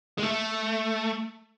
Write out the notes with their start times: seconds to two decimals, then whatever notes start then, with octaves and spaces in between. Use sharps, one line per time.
0.18 G#3
0.23 A3